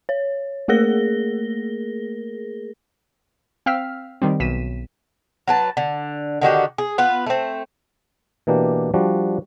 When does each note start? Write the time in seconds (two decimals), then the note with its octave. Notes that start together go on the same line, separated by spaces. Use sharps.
0.09 C#5
0.68 A3 A#3 G#4 A#4 A#6 G7
3.66 C4 F5 G5 E6 F6 B6
4.22 D#3 G3 C4
4.40 B1 B6 D#7 E7
5.48 F#3 B4 A5
5.77 D3
6.41 D3 D#3 F#4 G4
6.78 G#4
6.98 B3 F4 B4
7.26 A3 C4
8.47 B2 E3 A#3 D4 G4
8.94 F3 G3 D4 F#4